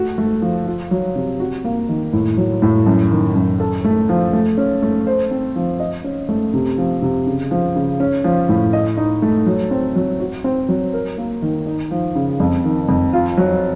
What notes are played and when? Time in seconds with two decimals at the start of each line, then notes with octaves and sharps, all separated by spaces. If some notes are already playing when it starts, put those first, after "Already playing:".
Already playing: A3 F#4
0.18 A3
0.42 F3
0.67 F4
0.91 F#3
1.16 C3
1.40 F#4
1.64 A#3
1.89 D#3
2.13 A2
2.38 F#3
2.62 A2
2.86 F#2
3.11 D#3
3.35 F#2
3.60 A4
3.84 A3
4.09 F3
4.33 A3
4.58 C#4
4.82 A3
5.07 C5
5.31 C4
5.56 F3
5.80 D#5
6.04 C#4
6.29 A3
6.53 C3
6.78 F3
7.02 C3
7.26 C#3
7.51 F3
7.75 C#3
8.00 C#4
8.24 F3
8.49 A2
8.73 D#5
8.97 D#4
9.22 A3
9.46 F#3
9.71 C4
9.96 F#3
10.20 F#4
10.44 C4
10.69 F#3
10.93 A#4
11.18 A#3
11.42 D#3
11.67 D#4
11.91 F3
12.15 C#3
12.40 F2
12.64 D#3
12.89 F2
13.13 F4
13.37 F#3